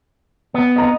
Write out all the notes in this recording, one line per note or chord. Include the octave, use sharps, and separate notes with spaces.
B3
D#5 A#5